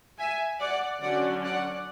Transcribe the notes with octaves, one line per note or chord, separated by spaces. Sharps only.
E5 G#5
D5 F#5
D3 F#3 C#4 D5 F#5
D5 F#5